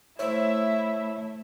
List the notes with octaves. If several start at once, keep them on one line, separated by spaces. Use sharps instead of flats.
A3 E4 C5 C#5 E5